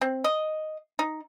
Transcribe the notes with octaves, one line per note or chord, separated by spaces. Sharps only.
C4
D#5
D#4